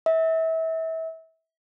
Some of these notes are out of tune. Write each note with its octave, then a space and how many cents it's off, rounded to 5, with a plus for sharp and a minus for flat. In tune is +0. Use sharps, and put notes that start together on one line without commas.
E5 -30